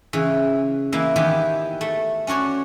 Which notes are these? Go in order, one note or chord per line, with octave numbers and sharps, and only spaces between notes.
C#3 E3
E3 A#3 E4
D#3 E3 B3 G4
A3
C#4 D4 F#4 C#5